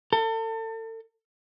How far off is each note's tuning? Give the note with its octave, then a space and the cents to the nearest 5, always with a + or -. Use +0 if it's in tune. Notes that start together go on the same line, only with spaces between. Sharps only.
A4 +35